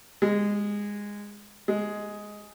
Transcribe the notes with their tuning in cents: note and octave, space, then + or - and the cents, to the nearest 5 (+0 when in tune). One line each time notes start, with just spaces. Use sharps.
G#3 -15
G#3 +5